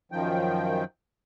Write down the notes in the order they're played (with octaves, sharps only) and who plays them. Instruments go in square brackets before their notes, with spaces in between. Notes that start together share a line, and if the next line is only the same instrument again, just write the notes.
[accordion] F#2 D#3 F3 G5